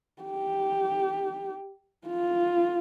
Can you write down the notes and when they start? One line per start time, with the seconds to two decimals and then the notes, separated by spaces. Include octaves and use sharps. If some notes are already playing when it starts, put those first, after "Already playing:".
0.23 G4
2.08 F4